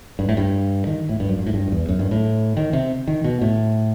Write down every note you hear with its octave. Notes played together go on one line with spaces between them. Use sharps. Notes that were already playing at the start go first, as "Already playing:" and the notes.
G2
A2
G2
D#3
A2
G2
F#2
G2
A2
G2
F#2
E2
F#2
G2
A2
D#3
C3
D#3
B2
A2